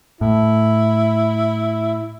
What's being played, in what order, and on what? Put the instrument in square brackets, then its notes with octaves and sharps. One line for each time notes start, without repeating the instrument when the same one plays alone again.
[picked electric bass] A2 [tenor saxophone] E4